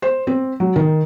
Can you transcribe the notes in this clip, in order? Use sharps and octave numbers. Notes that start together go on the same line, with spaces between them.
C5
C4
F#3
D#3